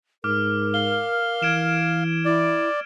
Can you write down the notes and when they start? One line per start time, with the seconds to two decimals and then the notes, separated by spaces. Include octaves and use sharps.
0.24 G#2 A#4 D6 F6
0.74 F5 G7
1.42 E3 G#6 D7 E7
2.25 E4 D5